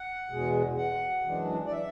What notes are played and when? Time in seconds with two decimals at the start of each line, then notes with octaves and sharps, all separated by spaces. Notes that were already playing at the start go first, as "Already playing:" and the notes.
Already playing: F#5
0.30 E2 B2 G#3
0.77 F#5
1.24 F#2 E3 G#3 D4
1.65 D5
1.72 E5